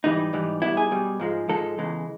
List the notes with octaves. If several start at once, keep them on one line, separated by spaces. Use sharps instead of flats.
G#2 E3 G3 D#4
G#2 E3 G3
B2 G3 E4
G#4
B2 G3
G#2 F3 G#3
G#2 F3 G#3 A4
E2 C#3 E3 G#3